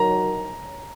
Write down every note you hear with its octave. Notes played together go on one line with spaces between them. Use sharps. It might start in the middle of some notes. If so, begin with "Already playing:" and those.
Already playing: F#3 D#4 F#4 A#4 A#5